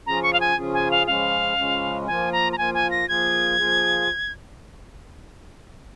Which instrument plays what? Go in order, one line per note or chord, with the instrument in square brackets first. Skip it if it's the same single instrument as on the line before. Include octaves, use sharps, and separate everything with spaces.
[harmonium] C#3 F3 C#4 F4 G#4 [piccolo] A#5
[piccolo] C#6
F5
G#5
[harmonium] C#3 F3 C#4 F4 G#4
[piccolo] G#5
F5
[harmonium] C#3 F3 G#3 C#4 [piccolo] F5
[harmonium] C#3 F3 G#3 C#4
[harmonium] F3 A#3 F4 [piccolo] G#5
[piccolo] A#5
A#5
[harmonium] F3 A#3 F4 [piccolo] G#5
[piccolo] G#5
A#6
[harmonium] F3 A#3 F4 G#4 [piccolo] G#6
[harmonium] F3 A#3 F4 G#4